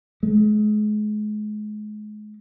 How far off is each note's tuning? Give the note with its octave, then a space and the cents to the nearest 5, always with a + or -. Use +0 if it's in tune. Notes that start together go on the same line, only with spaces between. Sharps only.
G#3 +35